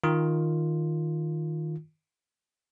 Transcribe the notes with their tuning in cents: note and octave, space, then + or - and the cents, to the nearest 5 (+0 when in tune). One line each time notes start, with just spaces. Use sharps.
D#3 +0 F4 +0